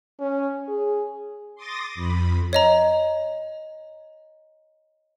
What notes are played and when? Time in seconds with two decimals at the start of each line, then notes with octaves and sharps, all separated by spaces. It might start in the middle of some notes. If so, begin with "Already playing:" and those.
0.20 C#4
0.68 G#4
1.55 C6 D6 D#6 A6 A#6
1.95 F2 B5
2.53 C#5 D#5 A#5